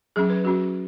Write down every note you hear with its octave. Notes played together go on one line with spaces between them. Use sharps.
F#3 C#4 G#4
B4
F#3 C#4 F#4